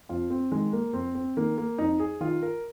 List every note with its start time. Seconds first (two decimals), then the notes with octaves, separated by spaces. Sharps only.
0.09 F2 F4
0.30 C4
0.51 D#3 G#3
0.73 A#3
0.93 F2 C4
1.15 C4
1.37 D#3 A#3
1.58 A#3
1.78 F2 D#4
2.00 G#4
2.20 D#3 F4
2.42 A#4